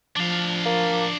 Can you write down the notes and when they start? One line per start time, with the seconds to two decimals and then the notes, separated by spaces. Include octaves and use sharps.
0.16 F3 D4 F5
0.65 A#3